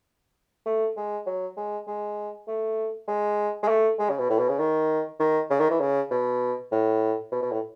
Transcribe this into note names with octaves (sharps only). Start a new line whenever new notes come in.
A3
G#3
F#3
G#3
G#3
A3
G#3
G#3
A3
G#3
C#3
B2
A2
B2
C#3
D#3
D#3
C#3
D#3
E3
C#3
B2
A2
B2
B2
A2